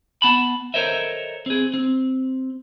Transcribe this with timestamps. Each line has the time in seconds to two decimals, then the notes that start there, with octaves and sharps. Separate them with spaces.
0.22 B3 A5 B5
0.74 A4 A#4 C5 C#5 D#5 E5
1.46 C4 G#4
1.74 C4